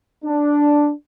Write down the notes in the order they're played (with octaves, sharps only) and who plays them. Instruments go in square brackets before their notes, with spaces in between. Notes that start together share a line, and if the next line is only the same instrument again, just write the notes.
[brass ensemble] D4